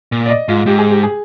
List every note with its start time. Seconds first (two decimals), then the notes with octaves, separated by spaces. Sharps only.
0.12 A#2
0.26 D5
0.30 D#5
0.48 G#2 F4
0.66 G#2 G4
0.79 G#4
0.90 G4
1.03 G#4